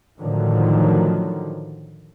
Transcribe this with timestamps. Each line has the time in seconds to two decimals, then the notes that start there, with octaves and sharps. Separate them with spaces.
0.20 A2 D3 D#3 F3 F#3